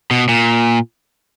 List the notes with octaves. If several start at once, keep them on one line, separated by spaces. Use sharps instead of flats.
B2
A#2